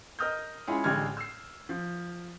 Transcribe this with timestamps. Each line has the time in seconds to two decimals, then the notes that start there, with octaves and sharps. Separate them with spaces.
0.19 A#4 D#5 D#6 F6 G6
0.67 G#3 C#4 E4 F4 G#4 C#5
0.84 A1 D3 G3 G#3 F6 G#6
1.17 E6 C7
1.69 F3